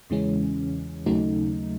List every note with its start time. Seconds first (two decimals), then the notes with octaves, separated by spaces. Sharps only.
0.10 E2 C#3 E3 G#3 C#4
1.06 D#2 C#3 F#3 A3 D#4